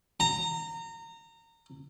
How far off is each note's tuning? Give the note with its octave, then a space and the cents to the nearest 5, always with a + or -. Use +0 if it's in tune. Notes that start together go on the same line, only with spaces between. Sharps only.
A#5 -25